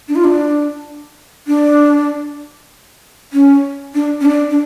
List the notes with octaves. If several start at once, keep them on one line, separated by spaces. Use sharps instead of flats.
D4
F4
D4
D4
C#4
D4
C#4
D4
D4